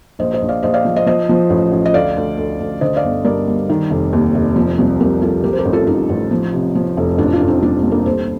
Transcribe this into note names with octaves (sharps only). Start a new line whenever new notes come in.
A#1 C5 D#5
C5 D#5
A#1
D5 F5
A#1 C5 D#5
D5 F5
F3
C5 D#5
F3 C5 D#5
F3
A1
A1
D#5
D2 D5 F5
D2
D2
D2
D3 C5 D#5
D5 F5
G1
G2 A#4 D5
G2
D#3
F1
D#2
F1
F3
C2
C2 G4 A#4
C2 F4 A4
F3 G4 A#4
C5
G4 A#4
A1
F4 A4
A1 D#4 G4
A1
F3
C3
F3
F1
A1 D4 F4
D4 F4
A1
C4 D#4
G2 D4 F4
G2
A#3 D4
D#2 A4 C5